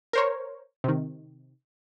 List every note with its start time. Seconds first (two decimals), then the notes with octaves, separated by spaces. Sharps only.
0.13 A#4 C5 C#5
0.84 C3 D#3